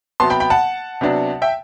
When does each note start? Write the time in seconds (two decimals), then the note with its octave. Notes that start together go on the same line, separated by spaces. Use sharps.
0.20 C3 F#3 B3 A5 C6
0.30 G5 B5
0.40 G5 B5
0.50 F#5 A5
1.01 C3 F#3 B3 D4
1.42 E5 G5